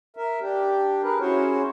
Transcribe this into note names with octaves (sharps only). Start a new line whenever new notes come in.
A#4 E5
D4 G4
G#4 A#4 B4
C#4 E4 F#4 G#4 C5 C#5